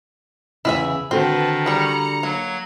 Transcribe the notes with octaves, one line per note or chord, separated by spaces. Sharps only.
E2 G2 C#3 E4 G#4 E5
D3 D#3 C4 F#4 A4 B4 A5
G3 G#4 A#5 C#7
F#3 A#3 G#6